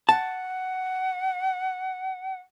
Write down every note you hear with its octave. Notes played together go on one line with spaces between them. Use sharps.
F#5 A5